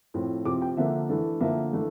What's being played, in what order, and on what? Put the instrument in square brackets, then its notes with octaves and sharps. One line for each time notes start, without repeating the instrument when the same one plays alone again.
[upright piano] A2 F3 C4
C3 F3 C4 D6
G5
D3 F3 A#3 D4 E5
E3 A3 D4
D3 F3 A#3 D4 E5
E3 A3 D4